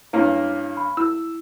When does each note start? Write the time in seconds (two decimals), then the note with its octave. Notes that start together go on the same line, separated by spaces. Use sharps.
0.13 G2 A#3 C#4 E4
0.77 B5
0.97 E4 E6